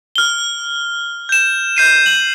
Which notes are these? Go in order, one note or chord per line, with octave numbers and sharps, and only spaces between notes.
F6 G7
G6 E7
G6 C7 D#7
F#7